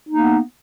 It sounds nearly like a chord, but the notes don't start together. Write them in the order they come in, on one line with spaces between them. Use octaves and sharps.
D#4 A#3 B3